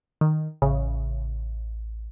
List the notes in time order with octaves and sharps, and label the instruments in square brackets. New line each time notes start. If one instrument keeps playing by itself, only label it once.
[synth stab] D#3
[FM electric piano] A1 [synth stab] C#3